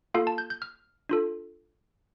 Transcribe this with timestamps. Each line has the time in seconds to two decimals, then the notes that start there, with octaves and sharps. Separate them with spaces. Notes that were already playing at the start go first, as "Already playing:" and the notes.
0.14 A#3 F4 A4 F5
0.27 A5
0.38 G6
0.50 G6
0.62 F6
1.09 D4 F4 A4